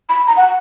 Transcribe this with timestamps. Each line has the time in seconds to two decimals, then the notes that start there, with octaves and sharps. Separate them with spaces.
0.09 B5
0.27 A#5
0.37 F#5